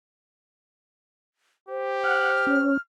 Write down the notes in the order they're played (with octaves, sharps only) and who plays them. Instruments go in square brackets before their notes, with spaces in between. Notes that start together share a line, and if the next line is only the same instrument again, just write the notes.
[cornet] G4 [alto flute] C5
[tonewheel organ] F#5 [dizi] F6
[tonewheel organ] C#4